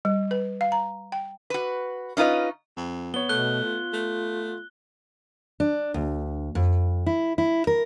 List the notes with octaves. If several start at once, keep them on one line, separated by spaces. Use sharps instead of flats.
G3
B4
F5
A#5
G5
F#4 B4
C#4 D#4 F4 B4 D#5
F2
B3 C#5 G7
B2 A3 F#6 G7
F4
A3
D4
D2
F2
E4
E4
A#4